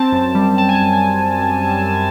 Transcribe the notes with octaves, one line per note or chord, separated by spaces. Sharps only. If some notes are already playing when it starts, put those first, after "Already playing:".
Already playing: C4 A5
F#2
G3
F#2 A5
G#5
A5
F#2
G#5